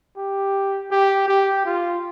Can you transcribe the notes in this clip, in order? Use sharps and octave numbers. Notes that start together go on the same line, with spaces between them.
G4
G4
G4
F4